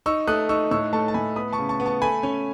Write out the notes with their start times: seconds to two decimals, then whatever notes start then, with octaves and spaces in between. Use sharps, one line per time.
0.06 D#4 C#6 E6
0.27 A3 D#6 F#6
0.49 D#4 C#6 E6
0.71 A2 C#6 E6
0.93 A3 A5 C#6
1.08 A5
1.14 A2 G#5 B5
1.36 B3 B5 D#6
1.53 A5 C#6
1.59 C#3
1.69 A5 C#6
1.80 B3
1.86 A5 C#6
2.02 A3 G#5 B5
2.23 C#4